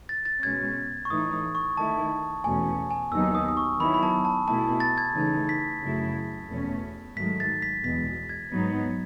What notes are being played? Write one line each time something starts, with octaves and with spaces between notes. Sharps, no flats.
A6
A6
B2 G#3 C#4 G#6
C#6
A2 E3 A3 D#4 D#6
D#6
C#6
D#3 A3 E4 A5
E2 B2 A3 C#4 G#5
G#5
D#2 D#3 F#3 B3 D#4 E6
D#6
D#6
C#6
D#3 F#3 B3 E4 B5
B5
A5
A5
B2 A3 E4 A5
A6
G#6
C#3 E3 A3 D#4
B6
F#2 C#3 F#3 A3 E4
E2 B2 A3 C#4
G#2 D#3 F#3 A3 B6
A6
B6
E2 B2 G#3 B6
G#6
G#2 F#3 B3 D#4